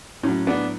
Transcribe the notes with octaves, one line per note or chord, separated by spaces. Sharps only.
A2 F#3 C#4
B3 D4